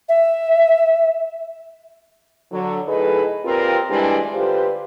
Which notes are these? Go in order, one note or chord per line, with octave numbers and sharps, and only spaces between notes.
E5
D3 F#3
A2 D#4 G#4 A4 B4
A#2 C4 F4 G4 A#4 B4
D2 E3 G3 G#3 D4 C5
D3 F4 G4 B4 C5